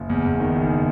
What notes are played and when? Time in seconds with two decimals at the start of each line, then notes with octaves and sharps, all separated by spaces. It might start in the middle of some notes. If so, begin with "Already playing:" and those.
Already playing: F#1
0.10 E2
0.25 E2
0.40 D#3
0.55 F#1